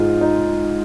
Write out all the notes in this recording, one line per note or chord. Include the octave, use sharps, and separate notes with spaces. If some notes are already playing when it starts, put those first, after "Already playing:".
Already playing: G#2 D#4 F4 G#4
D#4